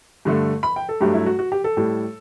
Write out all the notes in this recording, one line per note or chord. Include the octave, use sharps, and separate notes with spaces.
G2 D3 A3
B5
G5
A4
G2 F#3 A3 G4
E4
F#4
F#4
G4
A4
A2 G3